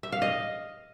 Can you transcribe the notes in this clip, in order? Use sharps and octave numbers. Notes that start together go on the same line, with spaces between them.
E5
F5
D#5